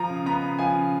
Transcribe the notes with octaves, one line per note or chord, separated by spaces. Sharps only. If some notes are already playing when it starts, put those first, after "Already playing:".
Already playing: F3 A#5
C#3
B3 A#5
C#3
F3 G#5
C#3